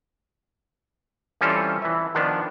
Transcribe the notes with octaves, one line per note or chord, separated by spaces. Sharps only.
E3 G3 C4 C#4 F4 A4
E3 E5
D#3 F3 B3 D4